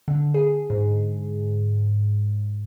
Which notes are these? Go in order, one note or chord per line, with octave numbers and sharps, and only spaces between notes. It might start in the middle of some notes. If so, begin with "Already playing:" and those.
D3
G#4
G#2